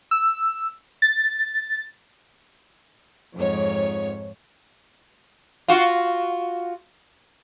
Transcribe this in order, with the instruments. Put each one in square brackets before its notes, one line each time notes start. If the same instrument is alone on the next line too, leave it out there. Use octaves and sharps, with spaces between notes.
[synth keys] E6
A6
[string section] F2 G#2 C#5
[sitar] F4 F#4